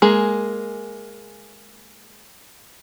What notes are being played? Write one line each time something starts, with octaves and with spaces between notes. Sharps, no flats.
G#3 A#3 G#4